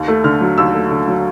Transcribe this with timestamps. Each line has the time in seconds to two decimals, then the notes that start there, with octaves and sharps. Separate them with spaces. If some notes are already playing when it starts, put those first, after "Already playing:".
Already playing: D#2
0.08 A3
0.24 D3 F6
0.41 F#3
0.58 D#2 E6
0.74 A3
0.91 D3
1.08 F#3